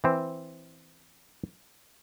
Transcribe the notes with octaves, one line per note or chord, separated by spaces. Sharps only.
E3 C4